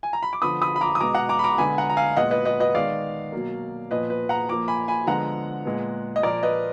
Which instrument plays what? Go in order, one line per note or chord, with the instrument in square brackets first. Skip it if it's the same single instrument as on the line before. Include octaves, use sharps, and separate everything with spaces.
[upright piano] G#5
A#5
B5
D6
D3 F3 B3 B5 D#6
B5 D#6
B5
A#5 D6
D#6
B2 G#3 B3 A#5 D6
F#5 A#5
A#5 D6
B5
A#5 D6
D3 G#3 B3 G#5 B5
F#5 A#5
A#5
F5 G#5
A#2 G#3 B3 D#5 F#5
B4 D#5
B4 D#5
B4 D#5
D#3 G#3 B3 D5 F5
B2 F#3 A#3
A#2 F3 B3 B4 D#5
B4
F#5 A#5
A#2 F3 A#3 A#5 D6
G#5 B5
G#5 B5
D3 F3 G#3 B3 F#5 A#5
A#2 G#3 B3
D#5
A#2 F3 A#3 A#4 D5
B4 D#5